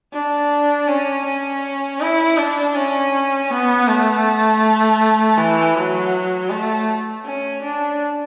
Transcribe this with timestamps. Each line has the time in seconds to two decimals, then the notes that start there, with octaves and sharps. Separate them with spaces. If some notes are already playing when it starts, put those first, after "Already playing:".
0.13 D4
0.88 C#4
1.25 C#4
2.01 E4
2.37 D4
2.75 C#4
3.51 B3
3.88 A3
5.38 E3
5.76 F#3
6.50 A3
7.26 C#4
7.63 D4